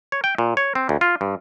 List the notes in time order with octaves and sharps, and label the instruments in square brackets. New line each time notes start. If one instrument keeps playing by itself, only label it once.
[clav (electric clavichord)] C#5
G5
A#2
C#5
C4
D2
F4
G2